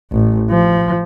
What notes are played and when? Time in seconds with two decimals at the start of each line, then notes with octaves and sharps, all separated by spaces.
0.12 A1
0.50 F3